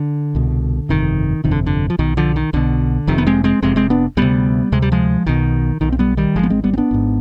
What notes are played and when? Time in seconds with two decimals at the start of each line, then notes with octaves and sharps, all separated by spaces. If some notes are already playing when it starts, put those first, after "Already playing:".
Already playing: D3
0.35 C2 B2
0.89 G1 F2 C3 D#3
1.44 G1 F2 C3 D#3
1.51 D3
1.66 D3
1.90 F3
1.98 B1 B2 D#3
2.17 D3 F3
2.36 D#3
2.53 B1 B2 D3
3.07 F1 F2 C3 D#3
3.18 B3
3.27 G#3 C4
3.44 G#3 C4
3.62 F1 F2 C3 G#3 C4
3.76 G#3 C4
3.90 B3 D4
4.17 D2 C3 G3 B3
4.72 D2 C3 G#3
4.82 G3
4.92 F3 G#3
5.27 B1 B2 D#3
5.81 B1 B2 D#3
5.92 C4
5.99 G3 B3
6.17 D#3 G3
6.35 G#1 G#2 F3 G#3
6.43 B3
6.50 G#3 C4
6.64 G3 B3
6.74 C4
6.78 B3 D4
6.91 G#1 G#2